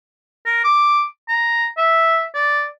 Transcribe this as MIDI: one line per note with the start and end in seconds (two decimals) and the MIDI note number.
0.46 0.63 70
0.64 1.03 86
1.29 1.66 82
1.77 2.25 76
2.34 2.66 74